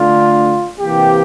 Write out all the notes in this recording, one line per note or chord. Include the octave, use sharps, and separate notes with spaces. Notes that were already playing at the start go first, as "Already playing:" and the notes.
Already playing: D3 A3 D4 F4
C3 E3 A#3 G4